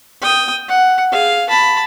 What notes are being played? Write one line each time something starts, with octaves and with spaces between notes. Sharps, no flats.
G5 D#6
F#5
G#4 F5
A5 B5